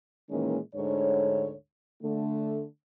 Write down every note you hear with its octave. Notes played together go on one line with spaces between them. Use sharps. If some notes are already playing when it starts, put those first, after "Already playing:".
A#2 D#3 E3 G#3 A#3 C#4
D2 G#2 D3 C#5
D3 A3